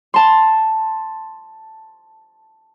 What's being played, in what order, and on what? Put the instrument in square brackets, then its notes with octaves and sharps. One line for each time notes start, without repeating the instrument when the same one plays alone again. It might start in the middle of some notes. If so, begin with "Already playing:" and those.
[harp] A5 C6